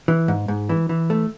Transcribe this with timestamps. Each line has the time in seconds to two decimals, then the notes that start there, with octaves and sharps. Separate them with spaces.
0.08 E3
0.28 G#2
0.48 G#2
0.69 E3
0.89 E3
1.10 A3